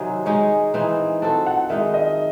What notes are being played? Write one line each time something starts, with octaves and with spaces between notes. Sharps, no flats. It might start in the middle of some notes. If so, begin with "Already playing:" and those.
Already playing: C3 D#3 F#3 C4 D#4 G#5
G#3 D#4 G#4 C#5
E3 C4 D#4
C4 F#4 A4 A5
F#5
D#3 G#3 D#4 E5
D#5